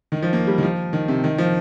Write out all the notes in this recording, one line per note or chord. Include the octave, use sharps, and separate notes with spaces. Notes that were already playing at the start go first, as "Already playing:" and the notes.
D#3
F3
A#3
G3
D#3
F3
D#3
C3
D#3
F3